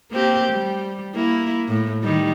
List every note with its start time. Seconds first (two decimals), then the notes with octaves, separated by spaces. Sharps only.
0.11 A#3 C4 G4
0.52 G3
1.15 A#3 E4
1.68 A2
2.03 D#3 G3